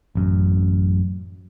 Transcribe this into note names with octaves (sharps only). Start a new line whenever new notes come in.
A1 F#2